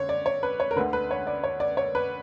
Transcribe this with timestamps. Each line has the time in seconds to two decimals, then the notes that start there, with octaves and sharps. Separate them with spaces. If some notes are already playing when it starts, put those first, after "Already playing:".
Already playing: D3 C#5
0.09 D5
0.26 C#5
0.43 B4
0.60 C#5
0.71 A#4
0.76 D3 B4
0.79 D2
0.93 B4
1.11 C#5
1.27 D5
1.44 C#5
1.60 D5
1.77 C#5
1.95 B4